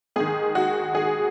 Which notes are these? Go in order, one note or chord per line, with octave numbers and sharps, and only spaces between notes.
G#2 D#3 G#4
F#4
G#4